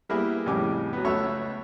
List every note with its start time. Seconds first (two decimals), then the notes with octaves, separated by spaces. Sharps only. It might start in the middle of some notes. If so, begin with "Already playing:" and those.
0.09 G3 A#3 B3 E4 G4 G#4
0.46 F2 A2 C#3 G3 G#5 D6
0.93 F#3 B3
1.04 C#2 A3 B3 C#5 E5 C#6